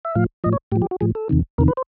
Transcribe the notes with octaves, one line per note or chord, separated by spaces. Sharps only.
E5
A2 F3 F5
A2 F3 D#5
C#5
A2 F3 G4
G4
F#4
A2 F3 G#4
A4
E2 C3 D#3
E2 C3 D#3 A#4
B4
C5